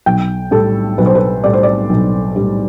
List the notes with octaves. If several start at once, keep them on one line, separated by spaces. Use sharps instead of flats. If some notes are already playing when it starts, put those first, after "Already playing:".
B1 G5
A2 G3 A4
B1 B4
C5
B4
A2 G3 D5
C5
D5
B1
A2 G3